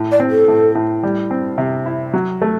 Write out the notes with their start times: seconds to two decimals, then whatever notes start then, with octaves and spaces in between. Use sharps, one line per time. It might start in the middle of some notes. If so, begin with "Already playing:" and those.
Already playing: A2
0.11 D5
0.20 C4
0.29 A4
0.48 A2
0.75 A2
1.03 G3
1.31 C4
1.58 C3
1.86 E4
2.13 F#3
2.42 A3